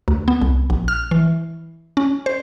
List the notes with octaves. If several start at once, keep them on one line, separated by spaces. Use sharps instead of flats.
D2
B3
C2
A#1
F6
E3
C#4
C5